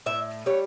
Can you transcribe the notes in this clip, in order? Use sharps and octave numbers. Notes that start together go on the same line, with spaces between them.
A2 E5
G3 C#5